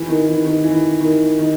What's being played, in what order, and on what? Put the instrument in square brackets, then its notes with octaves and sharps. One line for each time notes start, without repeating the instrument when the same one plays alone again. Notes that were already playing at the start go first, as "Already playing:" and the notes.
Already playing: [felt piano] E3
D#3
E3
D#3
E3
D#3
D#3